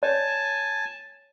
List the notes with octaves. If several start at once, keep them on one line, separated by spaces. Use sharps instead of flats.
C#5 G#5 A5